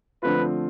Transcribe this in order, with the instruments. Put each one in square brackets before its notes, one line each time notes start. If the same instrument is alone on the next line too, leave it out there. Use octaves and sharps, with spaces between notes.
[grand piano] D3 F3 A3 C4 F4 [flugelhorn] B4